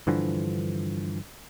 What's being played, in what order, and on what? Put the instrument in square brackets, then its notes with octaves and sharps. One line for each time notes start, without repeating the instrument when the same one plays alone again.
[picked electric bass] G2 D3 E3 F3